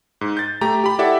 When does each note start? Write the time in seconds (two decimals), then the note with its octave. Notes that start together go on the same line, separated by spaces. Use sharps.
0.21 G#2
0.37 G6 A6
0.61 A3 G4 A#5
0.84 G4 B5
0.99 E4 G4 A4 D5 E5 F#5